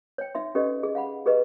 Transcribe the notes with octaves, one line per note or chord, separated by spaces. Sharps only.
C#5 G5
D#4 E5 C6
C#4 G4 A4 B4 D5 D#5
G#4 D#5
F5 F#5 B5
G4 G#4 B4 D#5